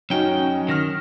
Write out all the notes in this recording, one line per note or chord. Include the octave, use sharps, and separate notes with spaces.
F#2 C#4 D#4 F#4 G5
D#3 F6 A#6 E7